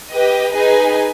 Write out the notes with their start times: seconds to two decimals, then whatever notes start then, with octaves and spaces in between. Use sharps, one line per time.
0.10 G4 B4 D#5
0.52 D#4 G#4 B4 D#5 G#5